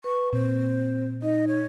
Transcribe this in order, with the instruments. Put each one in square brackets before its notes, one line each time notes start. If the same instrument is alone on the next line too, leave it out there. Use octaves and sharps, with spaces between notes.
[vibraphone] B4 [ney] C#6
[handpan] A#2 [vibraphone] C4 [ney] C5
[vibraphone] D#4 [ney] D#5
[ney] C#5